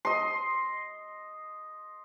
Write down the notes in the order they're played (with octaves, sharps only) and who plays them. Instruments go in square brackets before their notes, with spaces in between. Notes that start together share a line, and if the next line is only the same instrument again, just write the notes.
[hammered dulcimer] D#5 C6